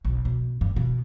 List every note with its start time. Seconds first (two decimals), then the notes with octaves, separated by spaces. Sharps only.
0.05 B1
0.25 B2
0.61 G2
0.76 B2